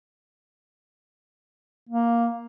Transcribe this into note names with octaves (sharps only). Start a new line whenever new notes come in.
A#3